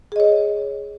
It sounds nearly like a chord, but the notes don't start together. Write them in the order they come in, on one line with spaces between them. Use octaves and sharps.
G#4 D#5 C#5